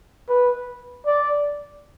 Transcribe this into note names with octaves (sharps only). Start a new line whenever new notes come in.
B4
D5